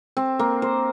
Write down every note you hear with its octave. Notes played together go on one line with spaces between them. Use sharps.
C4
A#3
C5